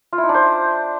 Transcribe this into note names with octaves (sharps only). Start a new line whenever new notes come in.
F4
E4
D#4
D4
C5